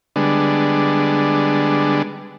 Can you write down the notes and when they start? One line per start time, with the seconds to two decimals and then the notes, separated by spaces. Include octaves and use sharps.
0.16 D3 G3 G#3 B3 D4